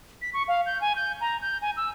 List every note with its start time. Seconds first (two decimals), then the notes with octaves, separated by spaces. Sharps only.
0.22 B6
0.34 C#6
0.48 F5
0.66 G6
0.81 G#5
0.96 G6
1.21 A#5
1.41 G6
1.62 G#5
1.77 E6